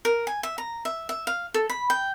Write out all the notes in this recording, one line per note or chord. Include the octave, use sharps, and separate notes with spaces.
A#4
G#5
E5
A#5
E5
E5
F5
A4
B5
G5